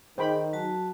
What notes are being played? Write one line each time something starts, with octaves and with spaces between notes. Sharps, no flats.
D#3 D#4 G#4 A#4 C5 G5 B5
F#3 F#4 A5